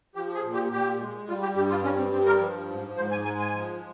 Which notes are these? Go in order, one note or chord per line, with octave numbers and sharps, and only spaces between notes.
F3 G4
G#4
A#2
G4
A#2 G4
G#3
G3 F4
G4
G2 G4
F4
G3 C#4
C4
G2 C4
A#4
F3
G#2
G#2 C5
G#5
G#3 G#5
G#5
F3